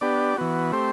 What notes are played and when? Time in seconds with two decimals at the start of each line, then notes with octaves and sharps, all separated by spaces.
0.01 B3 D4 G4 D5
0.37 E3 B3 F#4
0.72 A3 C4 G4 C5